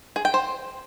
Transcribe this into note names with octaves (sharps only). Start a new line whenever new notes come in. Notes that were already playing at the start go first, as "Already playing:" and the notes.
G#4
G5
C5